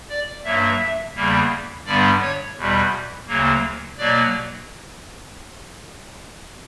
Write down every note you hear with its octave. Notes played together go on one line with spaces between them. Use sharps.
D5
G2 F#3 A#3 E5
E2 C#3 G3 A#3
G2 D3 G3 B3 D5
C#5
E2 B2 G3
D2 C#3 F#3 A#3
B2 F#3 A#3 D5